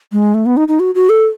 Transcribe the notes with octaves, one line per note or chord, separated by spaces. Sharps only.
G#3
A3
B3
D#4
D#4
F#4
F#4
A4